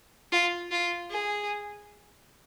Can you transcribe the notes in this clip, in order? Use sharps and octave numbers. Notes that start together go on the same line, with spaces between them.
F4
F4
G#4